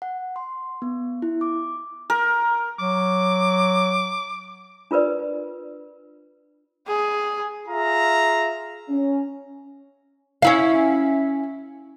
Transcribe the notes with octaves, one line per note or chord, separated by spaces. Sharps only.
F#5
C6
B3
E4
D6
A#4
F#3 D6
D4 F4 A#4 B4 D5
G#4
F4 G#4 E5 F5 A#5
C#4
C#4 E4 F5